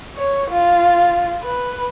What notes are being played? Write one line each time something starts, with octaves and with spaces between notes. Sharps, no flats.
C#5
F4
B4